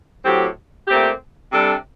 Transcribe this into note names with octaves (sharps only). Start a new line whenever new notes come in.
A2 F#3 C4 G4
A#2 A3 C4 G4
C3 G3 D4 A4